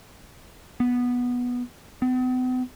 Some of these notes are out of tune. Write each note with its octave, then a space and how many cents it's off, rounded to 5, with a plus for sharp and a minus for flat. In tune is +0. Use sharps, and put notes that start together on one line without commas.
B3 -10
B3 +45